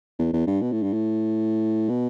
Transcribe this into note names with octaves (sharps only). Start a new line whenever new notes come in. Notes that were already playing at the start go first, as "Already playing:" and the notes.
E2
E2
G2
B2
A2
G2
A2
B2